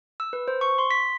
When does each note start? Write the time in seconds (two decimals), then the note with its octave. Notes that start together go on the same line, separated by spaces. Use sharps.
0.20 E6
0.33 B4
0.48 C5
0.61 C#6
0.78 C6
0.91 B6